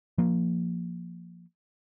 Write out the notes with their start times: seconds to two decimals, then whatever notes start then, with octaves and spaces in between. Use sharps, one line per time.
0.18 F3 A#3